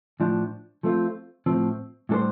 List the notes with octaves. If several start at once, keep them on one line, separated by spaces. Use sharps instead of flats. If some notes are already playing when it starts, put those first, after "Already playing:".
A2 F3 D4
F3 A3 C4 F4
A2 F3 C4
A2 G3 D4 A4 C5